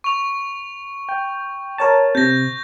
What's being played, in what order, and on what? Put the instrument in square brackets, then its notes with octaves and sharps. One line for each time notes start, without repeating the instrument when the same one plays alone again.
[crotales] C#6 F7
[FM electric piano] G5
A#4 C#5 A5
[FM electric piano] C3 [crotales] G6 A#6